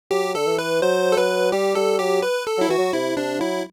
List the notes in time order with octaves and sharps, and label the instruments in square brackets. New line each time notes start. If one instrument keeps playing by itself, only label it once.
[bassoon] F#3 [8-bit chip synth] G4
[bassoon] D3 [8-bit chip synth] A4
[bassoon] E3
[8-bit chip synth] B4
[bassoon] F#3 [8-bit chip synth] C5
[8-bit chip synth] A4
[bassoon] F#3 [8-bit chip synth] B4
[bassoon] G3 [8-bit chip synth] G4
[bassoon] G3 [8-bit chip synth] A4
[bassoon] F#3 [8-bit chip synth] G4
[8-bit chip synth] B4
A4
[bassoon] F#3 [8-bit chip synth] E4
[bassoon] E3 [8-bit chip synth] F#4
[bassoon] F#3
[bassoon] C3 [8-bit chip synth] E4
[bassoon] C3 [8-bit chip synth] D4
[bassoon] F#3 [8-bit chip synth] E4